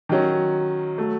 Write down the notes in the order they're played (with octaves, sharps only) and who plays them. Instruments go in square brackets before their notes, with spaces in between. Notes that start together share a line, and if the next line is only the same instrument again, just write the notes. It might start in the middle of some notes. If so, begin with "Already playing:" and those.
[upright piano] D#3 F#3 C#4
F#3 A3